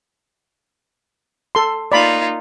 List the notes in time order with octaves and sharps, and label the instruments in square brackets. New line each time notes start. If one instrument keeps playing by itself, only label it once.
[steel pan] A4 C6
[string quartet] A#3 D#4 F4 [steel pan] D5 B5